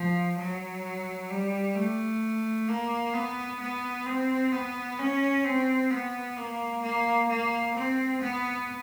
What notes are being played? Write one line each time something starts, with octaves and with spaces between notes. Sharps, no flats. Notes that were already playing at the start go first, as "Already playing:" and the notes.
Already playing: F3
F#3
G3
A3
A#3
B3
B3
C4
B3
C#4
C4
B3
A#3
A#3
A#3
C4
B3